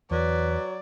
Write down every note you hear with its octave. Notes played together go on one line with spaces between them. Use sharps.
E2 F#3 B4 D5